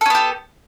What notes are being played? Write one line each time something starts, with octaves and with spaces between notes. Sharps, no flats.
B3 C#4 G4 A4